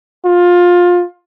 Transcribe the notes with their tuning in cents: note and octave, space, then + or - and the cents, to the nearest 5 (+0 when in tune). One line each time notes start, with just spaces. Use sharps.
F4 +20